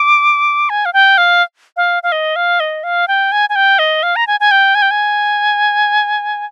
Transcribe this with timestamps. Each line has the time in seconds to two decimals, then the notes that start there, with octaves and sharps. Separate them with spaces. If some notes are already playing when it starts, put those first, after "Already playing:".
Already playing: D6
0.70 G#5
0.85 F5
0.93 G5
1.18 F5
1.77 F5
2.03 F5
2.12 D#5
2.36 F5
2.60 D#5
2.84 F5
3.08 G5
3.32 G#5
3.49 G#5
3.56 G5
3.79 D#5
4.03 F5
4.16 A#5
4.27 G#5
4.40 G#5
4.51 G5
4.75 G#5
4.82 G5
4.91 G#5